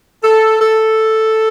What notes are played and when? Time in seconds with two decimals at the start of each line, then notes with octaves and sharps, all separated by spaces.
0.23 A4
0.60 A4